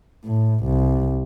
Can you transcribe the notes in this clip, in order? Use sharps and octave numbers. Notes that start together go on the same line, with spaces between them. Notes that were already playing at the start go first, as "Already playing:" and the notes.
A2
C2